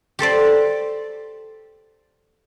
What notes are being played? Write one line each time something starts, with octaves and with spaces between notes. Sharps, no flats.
G4 A4 C5 D5